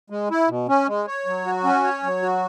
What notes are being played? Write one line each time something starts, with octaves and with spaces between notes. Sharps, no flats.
G#3
E4
B2
C#4
G#3
C#5
F#3
F#4
C#4
C#5
F#3
F#4